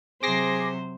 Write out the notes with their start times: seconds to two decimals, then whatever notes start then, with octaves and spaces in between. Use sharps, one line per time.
0.23 C3 F#3 G#4 C5 D6 A#6 C7